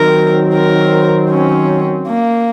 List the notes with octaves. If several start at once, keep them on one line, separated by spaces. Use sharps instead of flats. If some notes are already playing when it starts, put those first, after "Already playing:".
Already playing: D#3 F#3 C4 A#4
A#4
C#4
A#3